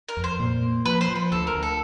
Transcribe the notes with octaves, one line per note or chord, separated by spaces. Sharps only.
A#4
F2
C5
A#2
A#3
F3 B4
C5
F3
B4
D2 A4
A#4
D2
A4